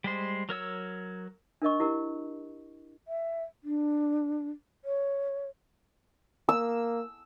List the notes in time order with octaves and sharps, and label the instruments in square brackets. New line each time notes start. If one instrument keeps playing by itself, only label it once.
[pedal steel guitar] G3 G#3 C5
F#3 A#4 C#5 E6
[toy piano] D4 A#4 D#5 C#6
E4 G4 A#4
[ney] E5
D4
C#5
[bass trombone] A#3 [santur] E6